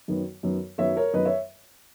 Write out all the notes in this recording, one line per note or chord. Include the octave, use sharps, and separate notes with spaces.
F#2 D#3 F#3 B3
F#2 D#3 F#3 B3
F#2 D#3 F#3 B3 C#5 E5
A#4 C#5
F#2 D#3 F#3 B3 B4 D#5
C#5 E5